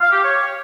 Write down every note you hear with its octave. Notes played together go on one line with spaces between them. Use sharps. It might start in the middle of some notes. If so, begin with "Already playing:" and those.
F5
G4
C#5